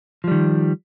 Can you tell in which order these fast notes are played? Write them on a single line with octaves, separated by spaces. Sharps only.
F3 G3 D#3